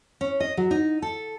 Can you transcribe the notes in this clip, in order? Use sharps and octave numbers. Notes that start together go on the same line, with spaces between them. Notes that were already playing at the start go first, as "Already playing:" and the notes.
C#4
D#5
F#3
D#4
A4